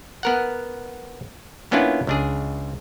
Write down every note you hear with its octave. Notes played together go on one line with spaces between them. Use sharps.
B3 A#4 F#5
A#3 B3 C#4 D4 E4 F4
C#2 D4 G#4